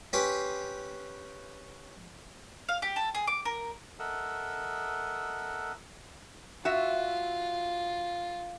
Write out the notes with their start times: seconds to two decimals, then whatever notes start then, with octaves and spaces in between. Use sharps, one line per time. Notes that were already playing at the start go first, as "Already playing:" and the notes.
0.13 C#4 G4 B4 C6
2.69 F5
2.82 G4
2.96 A4
3.15 G#4
3.27 D6
3.45 A#4
3.99 A4 A#4 D#5 E5 F#5
6.65 F4 F#4 E5